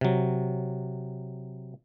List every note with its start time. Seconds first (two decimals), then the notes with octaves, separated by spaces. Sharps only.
0.01 C3 F#3